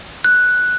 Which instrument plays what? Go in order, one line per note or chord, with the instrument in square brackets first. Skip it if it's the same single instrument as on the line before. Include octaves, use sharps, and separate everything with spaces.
[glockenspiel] F#6